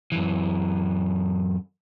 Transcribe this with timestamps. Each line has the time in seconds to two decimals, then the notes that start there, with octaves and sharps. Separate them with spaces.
0.12 F#2 E3